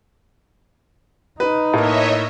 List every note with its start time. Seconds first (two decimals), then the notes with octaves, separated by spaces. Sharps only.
1.40 D#4 B4
1.74 A2 A#3 C#5 D#5 E5